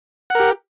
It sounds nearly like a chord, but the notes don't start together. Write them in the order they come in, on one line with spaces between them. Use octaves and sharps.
F#5 A#4 G4